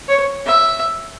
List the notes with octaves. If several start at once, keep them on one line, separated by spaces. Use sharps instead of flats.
C#5
E5